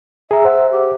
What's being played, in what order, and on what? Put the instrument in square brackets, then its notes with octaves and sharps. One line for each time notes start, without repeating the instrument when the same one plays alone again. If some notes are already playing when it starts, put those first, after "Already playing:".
[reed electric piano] G#4 A#5 [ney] E5
[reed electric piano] C5 F#5
[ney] G4